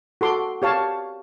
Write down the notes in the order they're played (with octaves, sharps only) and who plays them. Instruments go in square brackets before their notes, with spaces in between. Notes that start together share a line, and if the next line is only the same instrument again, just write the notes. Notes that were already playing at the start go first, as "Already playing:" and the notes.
[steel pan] F#4 A4 C6 D6
G4 C#5 F5 A5